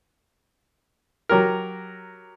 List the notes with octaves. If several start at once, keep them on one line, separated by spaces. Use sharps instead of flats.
F#3 G4 A#4